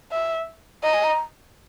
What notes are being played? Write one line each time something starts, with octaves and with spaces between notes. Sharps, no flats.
E5
D#5 A#5
G#5
A#5